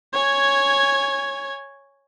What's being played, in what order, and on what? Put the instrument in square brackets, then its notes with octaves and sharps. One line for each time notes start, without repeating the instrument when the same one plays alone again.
[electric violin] C#5 G#5